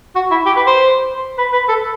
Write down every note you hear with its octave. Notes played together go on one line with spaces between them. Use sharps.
F#4
E4
G4
B4
C5
B4
B4
A4